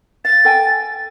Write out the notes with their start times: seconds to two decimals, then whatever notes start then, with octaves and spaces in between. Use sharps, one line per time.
0.25 F5 A6
0.45 A4 G5 G#5